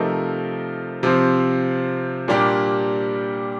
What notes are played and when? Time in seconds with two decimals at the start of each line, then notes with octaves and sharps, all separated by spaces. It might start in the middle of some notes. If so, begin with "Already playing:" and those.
Already playing: C3 F3 A3 D#4 A#4
1.03 C3 F3 C4
2.28 A#2 G3 A#3 D4 G4